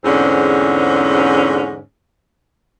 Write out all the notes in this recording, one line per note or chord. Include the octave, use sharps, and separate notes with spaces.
E2 G#2 D3 C4 C#4